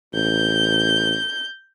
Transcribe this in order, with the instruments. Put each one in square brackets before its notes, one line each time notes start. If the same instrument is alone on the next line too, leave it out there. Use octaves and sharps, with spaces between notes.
[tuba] A1 [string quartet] G6